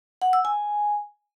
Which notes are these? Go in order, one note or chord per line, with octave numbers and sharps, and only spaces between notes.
F#5
E6
G#5